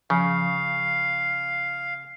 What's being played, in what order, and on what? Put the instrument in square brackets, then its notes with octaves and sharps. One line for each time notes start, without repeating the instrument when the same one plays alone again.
[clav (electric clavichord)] C#3 [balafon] F3 [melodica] F5